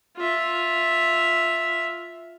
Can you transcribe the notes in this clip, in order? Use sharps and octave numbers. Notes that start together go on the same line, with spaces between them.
F4 E5